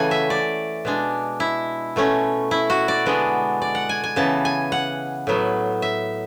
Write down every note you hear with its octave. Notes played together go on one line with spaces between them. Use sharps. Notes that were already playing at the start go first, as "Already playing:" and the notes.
Already playing: C#3 E3 A3 F#5 G#5
E5
D5
B2 G#3 D4
E4
B2 A3 C#4
E4
F#4
D5
D3 G#3 B3 D4
D5
F#5
G#5
G#5
C#3 E3 B3 A5
G#5
F#5
A2 F#3 B3
E5